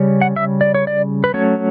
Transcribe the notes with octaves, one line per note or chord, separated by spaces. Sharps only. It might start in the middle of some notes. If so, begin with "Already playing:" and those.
Already playing: C#3 G3 C#4
F#5
E5
D5
C#5
D5
B4
F#3 A3 C#4 C#5